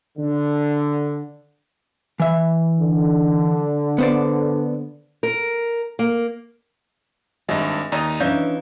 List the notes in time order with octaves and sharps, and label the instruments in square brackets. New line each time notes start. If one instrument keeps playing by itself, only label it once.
[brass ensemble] D3
[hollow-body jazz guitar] E3 E5
[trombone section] D3
[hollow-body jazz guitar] B3 C5 D5
[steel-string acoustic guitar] A#4
A#3
[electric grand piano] G#1 G2 [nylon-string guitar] G#4 [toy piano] D#5 E5
[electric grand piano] D#2 [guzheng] D#4 [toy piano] D5 E6
[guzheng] E3 [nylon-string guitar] C#4 D4 [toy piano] D5 E5 F5 [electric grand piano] G6